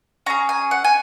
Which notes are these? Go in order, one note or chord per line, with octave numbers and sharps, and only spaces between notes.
C#4 G#4 A#5
G#5
F#5
G#5